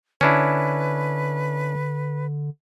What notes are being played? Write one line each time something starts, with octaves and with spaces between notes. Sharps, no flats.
D3 C#4 D4 E4 B4